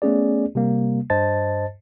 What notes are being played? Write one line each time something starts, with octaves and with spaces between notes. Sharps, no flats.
A3 B3 C#4 G#4 D5
C3 G3 A#3
G2 C5 D#5 A5 A6